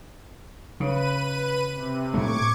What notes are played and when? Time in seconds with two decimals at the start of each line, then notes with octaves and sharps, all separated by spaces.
0.80 C#3 B4 D#7
1.74 C3
2.14 A2 G#3 A3 C#6 D6 G#6